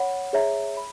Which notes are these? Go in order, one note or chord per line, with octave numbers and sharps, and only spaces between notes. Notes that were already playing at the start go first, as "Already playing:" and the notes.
Already playing: C#5 F#5 B5
G#4 C#5 E5 A#5
B5